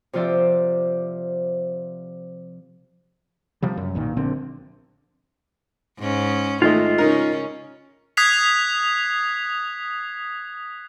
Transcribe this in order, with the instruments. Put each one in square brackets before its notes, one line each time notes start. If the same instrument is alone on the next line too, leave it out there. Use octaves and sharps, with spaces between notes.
[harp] C3 F3 F4 D5 E5 D6
[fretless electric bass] C3 F3 G3
F#2
B1 A#2 D#3
A#1 D3 C4
[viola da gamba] G#2 C#4
[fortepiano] D#3 A3 [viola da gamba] G#3 [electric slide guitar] F4 D#5
[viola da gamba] C#3 C#4 [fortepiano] D#4 A#4
[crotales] D#6 F#6 G#6 B6 C7 F7